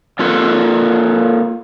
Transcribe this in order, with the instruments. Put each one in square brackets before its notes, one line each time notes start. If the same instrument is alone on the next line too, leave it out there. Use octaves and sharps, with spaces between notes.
[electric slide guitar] A#3 F4 A4 B4